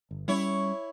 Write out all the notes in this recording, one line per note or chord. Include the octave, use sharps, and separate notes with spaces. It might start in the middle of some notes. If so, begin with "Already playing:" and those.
G1
G3 C4 C#4 E4 C#5